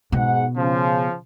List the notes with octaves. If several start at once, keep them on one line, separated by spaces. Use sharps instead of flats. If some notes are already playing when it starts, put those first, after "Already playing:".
G#2 B2 F#5
C#3 F3